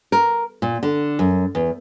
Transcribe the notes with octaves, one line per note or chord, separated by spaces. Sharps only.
A#4
A#2
D3
F#2
E2